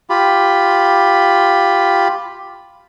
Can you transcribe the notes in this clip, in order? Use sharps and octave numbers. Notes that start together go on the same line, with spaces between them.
F4 G4 B5